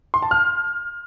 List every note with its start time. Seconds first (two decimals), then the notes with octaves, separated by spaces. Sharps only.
0.14 C6
0.22 A5
0.31 F6